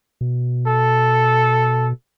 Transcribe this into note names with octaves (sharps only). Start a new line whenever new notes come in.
B2
A4